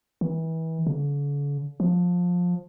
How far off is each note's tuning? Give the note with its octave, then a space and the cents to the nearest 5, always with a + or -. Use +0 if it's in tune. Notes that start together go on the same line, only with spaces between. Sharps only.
E3 -30
D3 -45
F3 +20